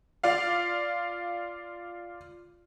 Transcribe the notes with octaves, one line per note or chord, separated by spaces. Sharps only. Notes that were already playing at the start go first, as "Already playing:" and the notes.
F4 D5 F5